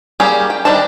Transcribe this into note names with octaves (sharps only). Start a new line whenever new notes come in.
G3 A#3 C#4 G4 G#4
G5
D#3 G3 D4 C5 A5